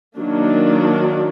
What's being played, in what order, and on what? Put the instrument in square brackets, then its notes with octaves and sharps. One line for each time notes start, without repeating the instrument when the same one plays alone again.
[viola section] D#3 F#3 A#3 D4